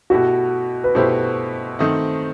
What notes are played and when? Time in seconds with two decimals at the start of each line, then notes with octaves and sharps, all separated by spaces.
0.10 B2 A3 E4 F#4 G4
0.84 B4
0.95 B2 A3 E4 G4 C5
1.79 D#3 A3 C4 D#4